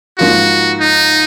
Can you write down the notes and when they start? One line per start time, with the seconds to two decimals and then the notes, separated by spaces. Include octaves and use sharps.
0.18 G#2 F3 A#3 F4 F#4
0.80 D#4